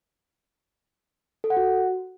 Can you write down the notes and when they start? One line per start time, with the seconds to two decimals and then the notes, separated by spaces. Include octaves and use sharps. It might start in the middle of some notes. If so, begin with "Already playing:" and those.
1.44 A4
1.50 F#5
1.57 F#4